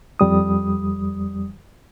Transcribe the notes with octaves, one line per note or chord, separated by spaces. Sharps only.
F2 G3 D#6